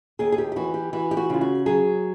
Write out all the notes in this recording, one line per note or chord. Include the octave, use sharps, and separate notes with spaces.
D#2 G#4
G#4
G4
G4
E3 F#4
G4
E3 F#4
G4
F#4
C#3 F4
F#4
F#3 G#4